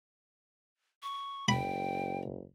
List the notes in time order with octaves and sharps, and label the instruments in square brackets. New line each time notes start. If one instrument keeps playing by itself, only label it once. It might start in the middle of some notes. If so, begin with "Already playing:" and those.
[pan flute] C#6
[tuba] F#1 [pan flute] G5 [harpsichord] B5